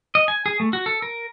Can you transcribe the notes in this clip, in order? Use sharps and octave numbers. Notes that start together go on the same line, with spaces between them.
D#5
G#5
G#4
A3
F#4
A4
A#4